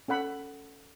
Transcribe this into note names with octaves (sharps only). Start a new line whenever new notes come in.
C#4 A4 F#5 B5